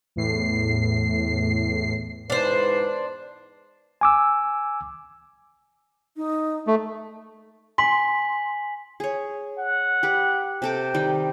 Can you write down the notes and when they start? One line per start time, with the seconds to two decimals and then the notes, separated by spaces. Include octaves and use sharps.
0.16 E2 A2 C7
2.30 E2 G#2 D4 B4 C5
4.01 G#5 D6 E6
6.17 D#4
6.67 A3
7.78 G#5 C6 B6 F#7
9.00 G#4 C#5
9.58 F#5
10.03 G4 B4
10.62 C3 A4 G5 D6
10.94 D#3 G3